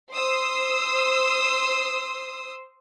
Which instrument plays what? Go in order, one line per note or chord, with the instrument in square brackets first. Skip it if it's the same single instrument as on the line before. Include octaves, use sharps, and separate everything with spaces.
[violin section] C5 C6 D#6 E6